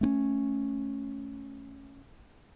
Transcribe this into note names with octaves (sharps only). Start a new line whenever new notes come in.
A3 C4 C#4